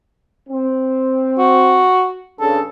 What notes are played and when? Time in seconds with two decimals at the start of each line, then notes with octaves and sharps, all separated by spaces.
0.49 C4
1.38 F#4
2.40 G2 C#3 A4